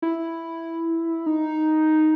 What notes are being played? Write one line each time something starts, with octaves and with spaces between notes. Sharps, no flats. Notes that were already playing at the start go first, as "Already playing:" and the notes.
E4
D#4